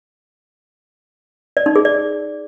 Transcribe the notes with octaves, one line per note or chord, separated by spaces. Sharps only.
D5
D#4
G#4
D5